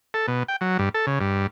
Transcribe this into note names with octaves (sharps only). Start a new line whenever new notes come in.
A4
B2
G5
F#3
G2
A4
C#3
G2